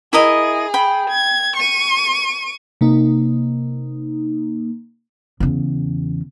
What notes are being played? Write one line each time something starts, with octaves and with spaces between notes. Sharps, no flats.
E4 G#4 A#4 D#5
G5 B5
G#6
C#6 D#7
C3 A#3 D#4
E2 C#3